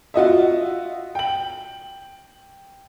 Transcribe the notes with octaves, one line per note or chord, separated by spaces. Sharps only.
F4 F#4 D#5 E5
G5 F#7